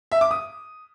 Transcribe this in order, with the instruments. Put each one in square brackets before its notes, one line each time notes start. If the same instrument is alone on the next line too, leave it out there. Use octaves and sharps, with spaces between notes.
[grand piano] E5
D6
D#6